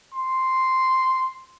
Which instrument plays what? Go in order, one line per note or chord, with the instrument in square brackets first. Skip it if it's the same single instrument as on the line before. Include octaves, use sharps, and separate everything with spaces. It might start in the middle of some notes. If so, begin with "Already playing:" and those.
[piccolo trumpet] C6